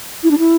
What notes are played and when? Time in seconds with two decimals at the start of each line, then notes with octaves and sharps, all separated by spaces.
0.23 E4
0.31 D4
0.38 E4